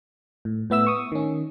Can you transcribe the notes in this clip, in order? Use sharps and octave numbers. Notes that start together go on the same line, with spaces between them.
A2
A2 B3 E5 E6
C#6 D#6
D#3 C#4